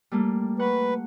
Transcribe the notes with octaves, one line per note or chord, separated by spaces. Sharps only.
G3 A3 A#3
B4 F#5 C#6